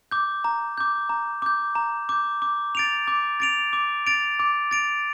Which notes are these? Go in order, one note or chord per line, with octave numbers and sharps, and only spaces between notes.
D6 G6
A#5
D6 G6
A#5
D6 G6
A#5
D6 G6
D6
A6 D7 F7
D6
A6 D7 F7
D6
A6 D7 F7
D6
A6 D7 F7